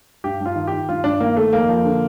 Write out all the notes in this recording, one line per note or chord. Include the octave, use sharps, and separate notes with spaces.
G2 G4
G2 F4
D#3
D#3 G4
G2 F4
G2 D4
D#3 A#3
D#3 A3
F2 A#3
F3
D3